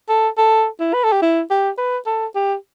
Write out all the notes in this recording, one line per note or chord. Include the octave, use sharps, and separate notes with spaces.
A4
A4
E4
B4
A4
G4
E4
G4
B4
A4
G4